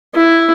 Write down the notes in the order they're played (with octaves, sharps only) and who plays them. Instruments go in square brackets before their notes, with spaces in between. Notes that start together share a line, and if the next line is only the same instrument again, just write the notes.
[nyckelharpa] E4